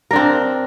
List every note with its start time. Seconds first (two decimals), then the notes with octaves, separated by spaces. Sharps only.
0.11 A#4
0.13 D4
0.16 C4